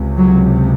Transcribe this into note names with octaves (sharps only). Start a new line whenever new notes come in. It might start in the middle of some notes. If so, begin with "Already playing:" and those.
Already playing: C#2 C3
F#3